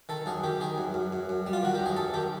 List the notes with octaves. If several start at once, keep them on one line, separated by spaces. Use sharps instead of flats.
D#3 A4
F#2 G#4
D#3 G4
D#3 G#4
F#2
F#2
F#2
F#2
G3
F4
D#3 F#4
F#2 G4
G#4
F#2 A4
D#3 G4